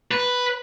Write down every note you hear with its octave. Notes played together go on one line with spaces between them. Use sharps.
B4